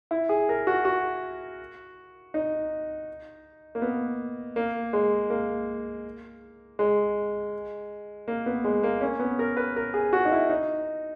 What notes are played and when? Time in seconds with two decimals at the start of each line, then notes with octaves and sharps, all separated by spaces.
0.11 E4
0.29 G#4
0.49 A#4
0.67 F#4
0.85 F#4
2.34 D#4
3.75 A#3
3.82 B3
4.56 A#3
4.93 G#3
5.30 A#3
6.79 G#3
8.28 A#3
8.46 B3
8.64 G#3
8.83 A#3
9.01 C#4
9.19 B3
9.39 A#4
9.57 B4
9.76 A#4
9.94 G#4
10.13 F#4
10.25 D#4
10.32 E4
10.50 D#4